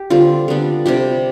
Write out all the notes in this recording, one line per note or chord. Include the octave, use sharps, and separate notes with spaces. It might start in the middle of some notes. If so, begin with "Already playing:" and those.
Already playing: G4
D3 G3 C4 F4
D3 G3 B3 D4
C3 G3 D4 G4